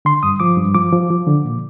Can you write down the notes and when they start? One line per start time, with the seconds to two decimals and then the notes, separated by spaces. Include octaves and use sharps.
0.05 D3 C6
0.23 G2 D#6
0.40 F3 D6
0.58 G2
0.74 F3 D6
0.92 F3
1.10 F3
1.27 D3
1.45 A#2